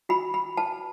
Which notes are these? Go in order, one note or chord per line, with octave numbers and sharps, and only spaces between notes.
F#4 B5
B5
B4 A5